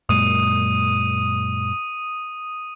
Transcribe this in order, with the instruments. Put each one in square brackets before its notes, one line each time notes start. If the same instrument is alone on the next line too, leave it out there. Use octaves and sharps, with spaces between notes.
[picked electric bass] F#2 A#2 G#3 [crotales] D#6 D#7